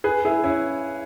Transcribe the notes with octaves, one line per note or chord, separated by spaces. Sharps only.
G#4 B4
E4 G#4
C#4 E4